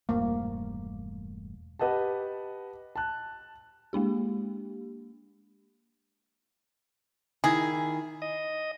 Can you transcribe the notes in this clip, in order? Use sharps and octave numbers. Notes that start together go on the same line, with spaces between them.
E1 G2 A3 A#3
G4 B4 D#5 F#5 A5
A5 F#6
G#3 A#3 D4 G4
D#3 E4 G#4
D#5